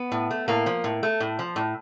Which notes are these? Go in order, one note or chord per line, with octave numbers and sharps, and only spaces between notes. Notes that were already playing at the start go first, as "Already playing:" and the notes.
Already playing: B3
A2
A3
A2 A#3
F3
A2
A3
A2
F3
A2